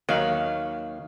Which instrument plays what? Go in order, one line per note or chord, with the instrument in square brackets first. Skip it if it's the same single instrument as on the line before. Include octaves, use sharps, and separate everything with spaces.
[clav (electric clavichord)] D#2 D#3 F#3 [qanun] F5 B5